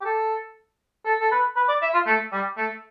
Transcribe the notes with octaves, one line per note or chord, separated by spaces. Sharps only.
G4
A4
A4
A4
B4
B4
D5
E5
F4
A3
G3
A3